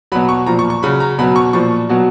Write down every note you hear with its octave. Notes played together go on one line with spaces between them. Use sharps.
B2 F#3 B5
C#6
A#2 F3 A#5
C#6
C#6
C#3 F#3 B5
A#5
B2 F#3 B5
C#6
A#2 F3 C#6
B2 F#3